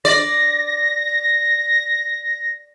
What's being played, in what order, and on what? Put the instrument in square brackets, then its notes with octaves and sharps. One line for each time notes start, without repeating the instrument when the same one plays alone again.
[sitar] D5 [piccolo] A#6